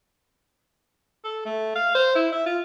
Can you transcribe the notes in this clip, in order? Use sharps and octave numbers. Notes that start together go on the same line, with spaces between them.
A4
A3
F5
C5
E4
E5
F4